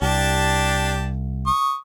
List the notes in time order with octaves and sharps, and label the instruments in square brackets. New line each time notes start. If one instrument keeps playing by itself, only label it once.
[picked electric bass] C2 [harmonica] D4 G4 A5
[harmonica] C#6 D#6